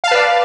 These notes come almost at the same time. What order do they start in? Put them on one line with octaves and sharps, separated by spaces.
F5 A5 B4 D5